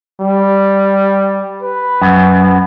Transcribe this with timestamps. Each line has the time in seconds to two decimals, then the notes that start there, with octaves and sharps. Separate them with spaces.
0.21 G3
1.63 B4
2.02 F#2